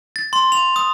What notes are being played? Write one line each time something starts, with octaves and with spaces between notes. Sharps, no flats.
A6
C6
F7
D#6